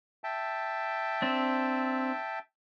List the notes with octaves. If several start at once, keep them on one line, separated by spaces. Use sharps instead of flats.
E5 G5 A5
C4 D4